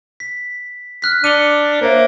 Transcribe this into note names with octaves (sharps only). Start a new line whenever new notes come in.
B6
F6 F#6 B6
D4 D6 C#7 D#7 F7 G7
A#3 C5 C#5 E5